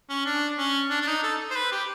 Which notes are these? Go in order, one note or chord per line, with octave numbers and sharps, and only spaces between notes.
C#4
D4
C#4
D4
D4
D#4
A4
C5
B4
G4